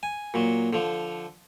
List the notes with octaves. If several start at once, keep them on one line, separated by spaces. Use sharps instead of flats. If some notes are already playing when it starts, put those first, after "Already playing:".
G#5
A#2 F#3
D3 F3